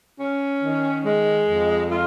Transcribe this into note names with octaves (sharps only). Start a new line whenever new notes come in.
C#4
D#3
G#3
F2
F4